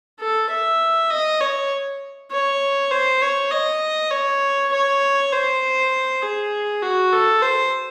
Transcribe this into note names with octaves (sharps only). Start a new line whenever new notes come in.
A4
E5
D#5
C#5
C#5
C5
C#5
D#5
C#5
C#5
C5
G#4
F#4
A4
C5